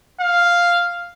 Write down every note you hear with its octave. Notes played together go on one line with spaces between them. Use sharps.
F5